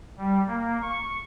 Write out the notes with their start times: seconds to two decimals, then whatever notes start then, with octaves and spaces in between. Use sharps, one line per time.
0.18 G3
0.47 A#3
0.82 C#6